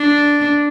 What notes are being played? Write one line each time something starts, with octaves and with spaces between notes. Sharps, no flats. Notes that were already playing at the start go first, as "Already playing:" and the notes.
Already playing: D4